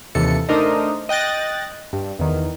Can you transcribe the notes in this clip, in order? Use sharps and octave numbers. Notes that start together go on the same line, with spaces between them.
D#2 C3 E3 A4 C#7
A3 D4 D#4 A#4 C5 D#5
D#5 G5 F#6 A6 A#6
G2
E2 D#3